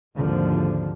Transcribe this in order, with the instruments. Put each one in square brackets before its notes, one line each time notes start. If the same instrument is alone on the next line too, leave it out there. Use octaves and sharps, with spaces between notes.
[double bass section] G#1 D#2 D3 F3